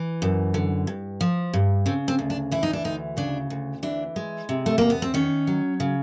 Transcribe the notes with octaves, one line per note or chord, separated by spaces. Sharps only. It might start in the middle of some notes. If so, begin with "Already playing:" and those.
Already playing: E3
F#2
D3
G2
F3
G2
C#3 C4
C4
D2
D4
E3 E4
D#4
D4
D2 D#4
C#3 D4
D2
E3 D4
G#3
C3
A3
E2 A#3
B3
C4
D#3 C#4
F#3
C#3